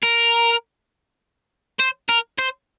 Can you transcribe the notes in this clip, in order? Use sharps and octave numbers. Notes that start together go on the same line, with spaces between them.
A#4
C5
A#4
C5